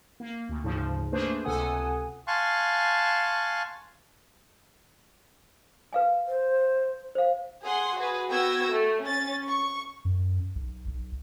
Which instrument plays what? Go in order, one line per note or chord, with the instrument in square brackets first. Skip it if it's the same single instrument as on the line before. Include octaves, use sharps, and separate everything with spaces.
[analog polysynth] A#3
D2
D2 G#2 C#3 F3
A3 A#3 D4 G#4 B4 C5
C#2 C3 A4 F#5 G#5 D#6
[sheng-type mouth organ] F5 G#5 A5 C6 C#6 F#6
[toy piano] B4 F5 G#5
[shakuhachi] C5
[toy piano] C5 F5
[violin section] G#4 F#5 C6
F#4 G#4 B4
B3 F#4 G5 E6 G#6 A#6
A3
C#4 A6
C#6
[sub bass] F#2
B1
B1